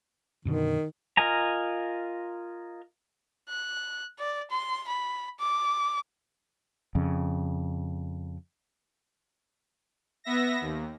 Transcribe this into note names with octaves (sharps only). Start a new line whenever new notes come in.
F#2 B2 D3 D#3
F4 A#4 D#5 G#5 A#5
F#6
D5
C6
B5
D6
F2 C#3
B3 E5 A#6
D#2